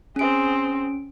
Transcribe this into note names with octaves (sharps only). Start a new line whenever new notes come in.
C4 C#4 G#4 D7